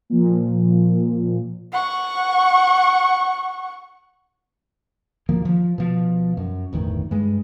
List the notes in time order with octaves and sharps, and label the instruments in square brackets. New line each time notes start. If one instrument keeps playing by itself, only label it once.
[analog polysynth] A#2 F3
[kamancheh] F#5 C#6
[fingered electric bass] D1 D#3 F3 A#3
F3
B2 F3
F#2
G1 E2 A2 D#3
G2 G#3